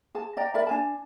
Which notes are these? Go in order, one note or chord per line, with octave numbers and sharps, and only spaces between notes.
G#4 A5
D5 D#5 G5 A#5
A#4 D5 E5 B5
D4 G#5 A5